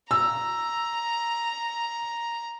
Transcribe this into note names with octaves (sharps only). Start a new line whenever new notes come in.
A#5 E6